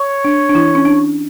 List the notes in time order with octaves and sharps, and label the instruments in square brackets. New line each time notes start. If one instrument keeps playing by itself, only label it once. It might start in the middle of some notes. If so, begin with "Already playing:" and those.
Already playing: [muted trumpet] C#5
[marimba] D4
D4
E3 E4
C#4
D4